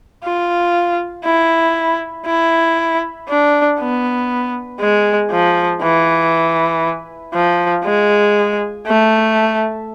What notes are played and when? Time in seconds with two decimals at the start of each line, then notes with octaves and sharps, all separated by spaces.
0.24 F4
1.25 E4
2.26 E4
3.29 D4
3.79 B3
4.80 G#3
5.31 F3
5.82 E3
7.34 F3
7.85 G#3
8.87 A3